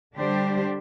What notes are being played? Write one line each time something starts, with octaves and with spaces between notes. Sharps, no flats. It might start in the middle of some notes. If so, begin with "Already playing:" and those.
D3 G3 D4 G4 C5